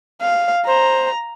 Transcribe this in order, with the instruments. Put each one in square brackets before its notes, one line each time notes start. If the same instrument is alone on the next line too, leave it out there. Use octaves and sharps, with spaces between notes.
[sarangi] F5
[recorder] C5 [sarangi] A#5